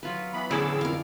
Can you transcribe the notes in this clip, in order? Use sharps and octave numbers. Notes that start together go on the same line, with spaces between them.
F#3 F4 B4
E3 B3 B5
E2 A2 D3 C#4 E4 G#4 D6 E6
F2 A#4 F5